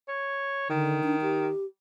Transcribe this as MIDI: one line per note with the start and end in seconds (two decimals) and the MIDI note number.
0.08 0.69 73
0.70 1.03 50
0.70 1.50 51
1.03 1.15 62
1.22 1.65 67